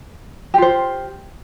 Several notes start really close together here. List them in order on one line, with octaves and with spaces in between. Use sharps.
G4 F4 C5